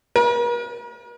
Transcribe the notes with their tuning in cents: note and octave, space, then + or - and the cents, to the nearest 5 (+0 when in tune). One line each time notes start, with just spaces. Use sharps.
A#4 +45